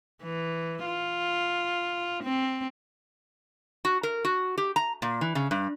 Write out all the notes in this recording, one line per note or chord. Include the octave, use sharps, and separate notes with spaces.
E3
F4
C4
F#4
A#4
F#4
G4
A#5
A#2
E3
C#3
G2